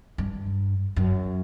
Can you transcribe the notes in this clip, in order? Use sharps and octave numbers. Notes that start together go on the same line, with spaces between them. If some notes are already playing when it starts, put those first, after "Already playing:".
G2
F#2